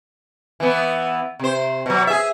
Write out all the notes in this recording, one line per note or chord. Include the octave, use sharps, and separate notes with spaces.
E3 B3
C3 C5
B2 F#3
G#4 E5